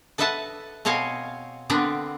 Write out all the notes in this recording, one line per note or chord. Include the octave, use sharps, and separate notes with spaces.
A4 B4 D#5 E5 F#5 A5
B2 C4 C#5 D#5 F5 G#5
D3 B3 C4 D4 A#4 B4